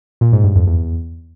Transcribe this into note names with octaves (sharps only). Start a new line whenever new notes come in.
A#2
G#2
G2
F2
E2